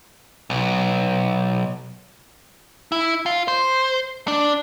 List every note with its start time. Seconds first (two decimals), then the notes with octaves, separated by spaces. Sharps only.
0.50 B1
2.92 E4
3.26 F4
3.48 C5
4.28 D4